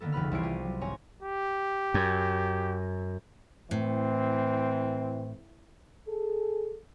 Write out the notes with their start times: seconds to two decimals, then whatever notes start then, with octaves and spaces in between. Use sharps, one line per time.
0.01 D3 D#3 A#3 B3 A4
0.12 F1 C#2 B4 B5 F6
0.31 C2 E3 E4 C#5 C7 D7
0.43 F4 G4 A#5 D#7
0.65 F#3
0.81 G#1 C4 C#5 G#5 A#5
1.23 G4
1.94 F#2
3.71 A2 E3 C4
6.08 G#4 A4